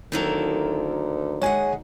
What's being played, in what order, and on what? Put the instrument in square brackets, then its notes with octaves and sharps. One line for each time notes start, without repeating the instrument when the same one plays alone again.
[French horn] D2 [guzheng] D#3 F#3 A#3 [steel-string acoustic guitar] C4 E4 A4
[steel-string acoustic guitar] G#3 G#4 F#5 [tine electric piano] C#5 G#5